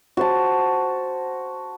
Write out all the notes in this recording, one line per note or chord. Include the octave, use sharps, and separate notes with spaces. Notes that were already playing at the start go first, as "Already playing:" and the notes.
F#4 C5 A5